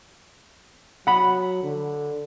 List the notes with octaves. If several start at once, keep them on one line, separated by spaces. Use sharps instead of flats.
F#3 F#5 B5
D3